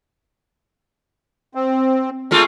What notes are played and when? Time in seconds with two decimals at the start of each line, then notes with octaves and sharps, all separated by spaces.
1.55 C4
2.31 G#3 A3 F4